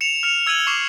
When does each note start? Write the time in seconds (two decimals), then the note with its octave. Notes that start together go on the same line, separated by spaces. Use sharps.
0.01 C#7 E7 F7
0.23 F6 C#7 F7
0.47 E6 G#6 C#7 D#7 F#7
0.67 C#6 D6 C7 E7